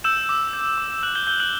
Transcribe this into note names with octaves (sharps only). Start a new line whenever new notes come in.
E6 G6 E7
D6
G6
D6
E6 F#6 F#7
G6 G7
E6 G6 G7
F#6 F#7